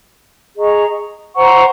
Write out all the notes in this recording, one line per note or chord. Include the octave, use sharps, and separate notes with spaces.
G#4 D#5 A#5 C#6
C5 F#5 A#5 C#6